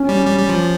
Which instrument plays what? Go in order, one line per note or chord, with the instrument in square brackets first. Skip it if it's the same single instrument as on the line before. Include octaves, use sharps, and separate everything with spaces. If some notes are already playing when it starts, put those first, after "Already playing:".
Already playing: [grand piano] C#4
[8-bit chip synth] G3
G3
G3
F3